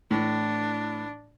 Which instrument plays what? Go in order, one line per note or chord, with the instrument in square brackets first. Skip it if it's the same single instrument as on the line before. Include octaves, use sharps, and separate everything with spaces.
[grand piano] A2 E3 [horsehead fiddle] D4